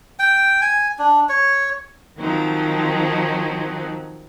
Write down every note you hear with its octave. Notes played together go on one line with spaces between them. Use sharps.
G5
G#5
D4
C#5
D#3 F3 F#3 C4 D#4